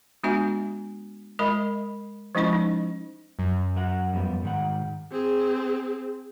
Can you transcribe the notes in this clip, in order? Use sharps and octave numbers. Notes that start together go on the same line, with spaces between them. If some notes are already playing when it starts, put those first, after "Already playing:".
G#3 B3 D4 F#4 E5 G#5
G#3 A#4 D#5 E5 B5
F3 G#3 C#4 E4 D#5 C#6
D#4
F#2
F#3 A#4 F#5
F2 G3 B3
G#2 D#3 F#5
C4 G#4